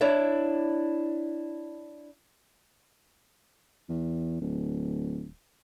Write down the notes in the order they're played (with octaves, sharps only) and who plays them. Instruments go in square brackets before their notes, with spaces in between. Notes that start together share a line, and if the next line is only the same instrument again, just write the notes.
[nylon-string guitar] D4 E4 C#5 D5 E5
[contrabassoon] E2
D1